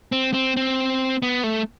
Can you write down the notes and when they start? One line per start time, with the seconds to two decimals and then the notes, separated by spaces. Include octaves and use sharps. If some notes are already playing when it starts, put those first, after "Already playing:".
0.12 C4
0.34 C4
0.57 C4
1.22 B3
1.44 A3